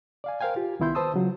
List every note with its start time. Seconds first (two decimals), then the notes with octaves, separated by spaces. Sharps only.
0.24 D5 F5 G#5
0.41 A#4 C5 F5 G5 G#5
0.56 F4 G4
0.79 C2 D#3 B3 E4 C6 G6
0.95 B4 C5 A5 D#6 E6
1.14 C#3 F#3 F4